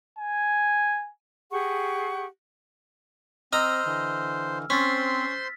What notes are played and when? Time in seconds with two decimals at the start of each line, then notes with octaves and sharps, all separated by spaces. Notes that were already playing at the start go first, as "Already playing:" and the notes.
0.19 G#5
1.52 G4 G#4 F#5 C#6
3.53 C4 C5 D#5 A#5 E6 F6
3.85 D3 E3
4.70 C4 C#4 C5 C6 A6 B6